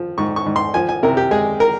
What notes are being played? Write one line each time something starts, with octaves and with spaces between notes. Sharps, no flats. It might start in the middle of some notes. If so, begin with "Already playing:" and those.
Already playing: F3
G#2 C#6
C#6
G#2
C6
F3 G#5
G#5
C3 A#4
G4
G#3 G#4
A#4